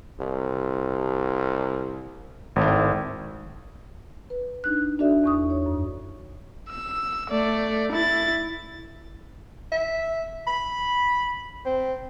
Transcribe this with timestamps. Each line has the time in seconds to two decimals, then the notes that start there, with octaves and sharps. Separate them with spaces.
0.20 C2
2.56 G#1 A2
4.30 B4
4.64 D4 D#4 F#6
4.99 D4 F#4 A4 D5 E5
5.24 E2 C#6 D#6
5.50 C#5
5.66 F#2
6.70 E6
7.30 A3 D5
7.92 E4 A6
9.72 E5
10.47 B5
11.66 C4